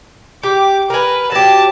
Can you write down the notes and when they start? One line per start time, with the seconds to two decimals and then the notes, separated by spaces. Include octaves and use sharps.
0.43 G4 D6
0.90 A#4 B4 G#5
1.32 F#3 G4 A5